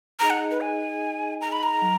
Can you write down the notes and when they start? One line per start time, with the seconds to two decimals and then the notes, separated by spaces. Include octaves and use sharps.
0.20 D#4 G#4 D#5 A#5
0.30 F#5
0.51 B4
0.61 G#5
1.41 A#5
1.52 B5
1.63 A#5
1.82 F#3